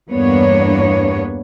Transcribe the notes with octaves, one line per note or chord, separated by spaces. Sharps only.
E2 G2 A#3 B3 D4 C#5